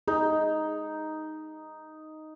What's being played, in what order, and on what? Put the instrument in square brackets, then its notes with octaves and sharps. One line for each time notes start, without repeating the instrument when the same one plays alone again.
[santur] D#4 [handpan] G#4